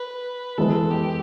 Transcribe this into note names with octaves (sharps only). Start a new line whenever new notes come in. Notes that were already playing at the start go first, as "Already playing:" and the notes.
Already playing: B4
E3 G#3 B3 A4
G4